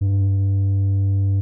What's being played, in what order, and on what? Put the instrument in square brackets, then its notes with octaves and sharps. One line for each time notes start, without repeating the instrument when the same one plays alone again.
[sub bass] G2